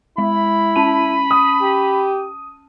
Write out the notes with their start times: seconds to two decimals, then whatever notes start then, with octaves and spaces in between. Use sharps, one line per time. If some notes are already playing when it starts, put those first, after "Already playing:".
0.18 G#3 E4 B5
0.76 C#4 A5 D#7
1.31 D#6
1.62 G4